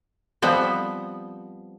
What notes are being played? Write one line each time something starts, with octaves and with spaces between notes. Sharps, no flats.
F3 G3 B3 C4